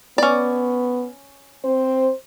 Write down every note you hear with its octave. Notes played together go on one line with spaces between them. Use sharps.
B3 C#4 D5
C4 C5